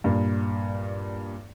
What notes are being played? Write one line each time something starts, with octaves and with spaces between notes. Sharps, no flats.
G2 A#2